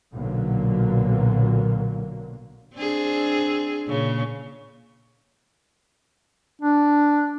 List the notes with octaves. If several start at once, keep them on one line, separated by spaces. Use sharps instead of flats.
B1 A#2 D3 F#3 A#3
C4 D4 G#4
A#2 C#3
D4